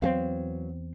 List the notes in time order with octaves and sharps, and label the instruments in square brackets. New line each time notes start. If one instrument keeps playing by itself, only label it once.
[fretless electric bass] E2 A3 C4 [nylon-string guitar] F#3 B3 F5